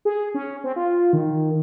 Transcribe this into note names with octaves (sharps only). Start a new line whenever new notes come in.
G#4
C#4
C4
F4
D#3